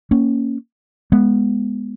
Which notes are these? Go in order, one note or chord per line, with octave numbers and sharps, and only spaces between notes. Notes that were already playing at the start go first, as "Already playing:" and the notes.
A#3 C#4
G#3 B3